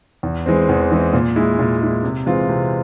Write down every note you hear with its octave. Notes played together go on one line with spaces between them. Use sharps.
E2
E3 G#3 C4
E2
E3 G#3 C4
A#2
G#3 E4
A#2
G#3 E4
C3
E3 G#3 C4 F4
C3